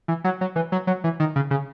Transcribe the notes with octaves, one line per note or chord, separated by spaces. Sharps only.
E3
F#3
F#3
E3
F#3
F#3
E3
D#3
C#3
C#3